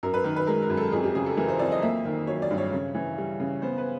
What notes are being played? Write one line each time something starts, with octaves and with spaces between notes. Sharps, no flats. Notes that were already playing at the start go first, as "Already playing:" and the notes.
F#2 A#4
B4
D#3
B4
G#3 A#4
A#4
F#2
A4
F2 G#4
G4
C#3 G#4
A4
E3 A#4
C5
F2 D5
D#5
A#3 E5
D#3
F#3 C#5
D5
G2
C#5
C#3
E3
G3
C#3
B3 C5
B4